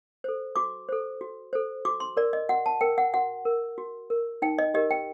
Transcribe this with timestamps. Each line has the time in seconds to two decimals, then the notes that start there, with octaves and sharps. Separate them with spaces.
0.24 A4 C5
0.56 F#4 D6
0.89 A4 C5
1.21 F#4
1.53 A4 C5
1.85 F#4 D6
2.00 C6
2.17 A#4 D5
2.33 D#5
2.49 F#4 F#5
2.66 A5
2.81 A#4 G5
2.98 F#5
3.14 F#4 F#5
3.45 A#4
3.78 F#4
4.10 A#4
4.42 D#4 G5
4.59 D#5
4.74 G4 A#4 D#5
4.91 G5